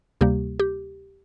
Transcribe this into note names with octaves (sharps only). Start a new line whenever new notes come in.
D2 C3 G3 A#3 G4
G4